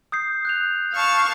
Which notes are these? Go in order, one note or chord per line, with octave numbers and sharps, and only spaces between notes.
D#6 G6 C7
F#6 G6 F7
F5 A5 C#6